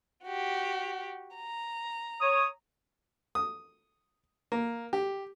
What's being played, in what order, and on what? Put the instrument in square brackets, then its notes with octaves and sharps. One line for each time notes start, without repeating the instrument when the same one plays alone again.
[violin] F#4 G4
A#5
[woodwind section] C#5 D#6
[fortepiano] D#6
A#3
G4